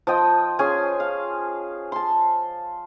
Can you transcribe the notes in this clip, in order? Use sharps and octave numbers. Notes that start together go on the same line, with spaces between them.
F3 D#5 G5
C#4 F4 G#4 G#5
F5
A5 C6